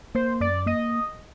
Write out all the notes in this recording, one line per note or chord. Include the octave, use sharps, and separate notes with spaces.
A#3 C5
F#2 D5
A#3 D#5